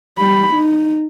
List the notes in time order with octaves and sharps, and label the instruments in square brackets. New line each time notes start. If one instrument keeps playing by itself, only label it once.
[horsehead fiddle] G3 B5
D#4